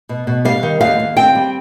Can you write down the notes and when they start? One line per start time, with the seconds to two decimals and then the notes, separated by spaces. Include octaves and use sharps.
0.09 B2
0.27 B2
0.45 G3 F5
0.63 D#3
0.81 D#2 F5
0.99 D#2
1.17 C4 G5
1.35 G3